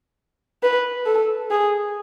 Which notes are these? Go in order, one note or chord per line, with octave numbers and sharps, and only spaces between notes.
B4
A4
G#4